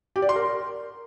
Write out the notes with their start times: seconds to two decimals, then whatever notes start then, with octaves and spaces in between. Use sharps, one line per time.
0.16 G4
0.22 D5
0.29 C6
0.36 A#4